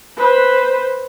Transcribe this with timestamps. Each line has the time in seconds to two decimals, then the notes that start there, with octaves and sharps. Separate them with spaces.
0.18 B4 C5